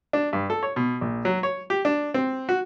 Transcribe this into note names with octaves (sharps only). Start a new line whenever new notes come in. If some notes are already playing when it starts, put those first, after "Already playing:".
D4
G2
A4
C#5
B2
A#1
F#3
C#5
G4
D4
C4
F#4